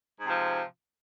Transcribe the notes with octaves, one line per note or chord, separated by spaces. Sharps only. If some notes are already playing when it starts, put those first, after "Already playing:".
G#2 C3 F3